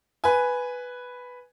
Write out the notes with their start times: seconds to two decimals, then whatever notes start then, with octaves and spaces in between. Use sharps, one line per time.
0.24 B4 G#5